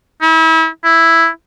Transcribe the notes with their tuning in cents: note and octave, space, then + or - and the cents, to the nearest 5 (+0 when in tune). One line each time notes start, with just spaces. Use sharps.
E4 -35
E4 +0